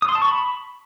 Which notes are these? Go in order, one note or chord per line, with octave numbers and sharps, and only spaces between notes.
D#6
C6
A5
C#6
B5